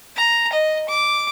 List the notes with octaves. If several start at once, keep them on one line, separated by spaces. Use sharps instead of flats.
A#5
D#5
D6